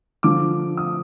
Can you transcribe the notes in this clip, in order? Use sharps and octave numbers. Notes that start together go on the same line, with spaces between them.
D3 F3 D6
D#6